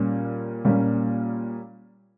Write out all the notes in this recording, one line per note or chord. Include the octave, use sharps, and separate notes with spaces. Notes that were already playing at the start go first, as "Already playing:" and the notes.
Already playing: A#2 G3 A#3 C#4
A#2 G3 A#3 C#4